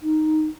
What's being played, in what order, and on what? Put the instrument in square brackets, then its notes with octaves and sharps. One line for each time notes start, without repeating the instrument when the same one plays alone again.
[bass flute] D#4